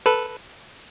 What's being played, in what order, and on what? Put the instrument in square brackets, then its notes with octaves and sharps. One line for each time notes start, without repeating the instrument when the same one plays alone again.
[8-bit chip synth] A4 B4